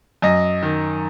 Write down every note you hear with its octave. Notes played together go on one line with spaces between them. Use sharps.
F#2 D#5
D#3